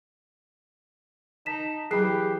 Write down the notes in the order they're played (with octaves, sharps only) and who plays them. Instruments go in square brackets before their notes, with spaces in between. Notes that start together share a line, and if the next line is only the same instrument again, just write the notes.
[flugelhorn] D#4 [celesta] A5 B6 E7
[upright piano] E3 F#3 B5 [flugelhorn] G4 [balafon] G#4 [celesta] F#6 C7